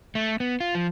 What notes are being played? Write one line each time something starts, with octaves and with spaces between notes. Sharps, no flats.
A3
B3
F4
F3